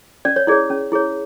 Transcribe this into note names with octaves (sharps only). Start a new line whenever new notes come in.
C#4 D5
C#5
E4 G#4 C#5 D5
C#4
E4 G#4 C#5